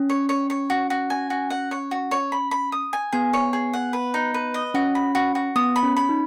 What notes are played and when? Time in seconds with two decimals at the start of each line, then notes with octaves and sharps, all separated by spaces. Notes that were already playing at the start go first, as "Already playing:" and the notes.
Already playing: C#4
0.10 C#5
0.29 C#5
0.50 C#5
0.70 F#4
0.90 F#4
1.10 G#5
1.30 F#4
1.50 F#5
1.71 C#5
1.91 F#4
2.11 C#5
2.32 B5
2.51 B5
2.72 D#6
2.93 G#5
3.13 B3 G#4
3.33 C#5
3.53 G#4
3.73 F#5
3.93 B4
4.14 D#4
4.34 B4
4.54 D#5
4.74 C#4 F#4
4.95 B5
5.15 F#4
5.35 F#4
5.56 B3 D#6
5.76 B5
5.83 C#4
5.96 B5
6.09 D#4